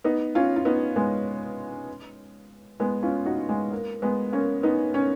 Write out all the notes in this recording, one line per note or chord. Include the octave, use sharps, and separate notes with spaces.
B3 D#4
C#4 F4
F4
B3 D#4
G#3 B3
G#3 B3
C#4 F4
D#4 F#4
G#3
A#3
G#3 B3
A#3 C#4
B3 D#4
C#4